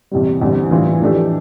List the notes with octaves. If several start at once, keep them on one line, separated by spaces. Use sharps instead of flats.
E2 C3 G3
E2 D3 G3 C4
A2 E3 G3 D4 F4
F2 E3 A3 D4 G4